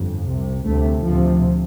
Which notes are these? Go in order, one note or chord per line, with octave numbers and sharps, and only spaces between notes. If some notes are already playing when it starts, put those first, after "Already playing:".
Already playing: G1 F2
C2 C3
D2 C3 A3
D2 C3 F3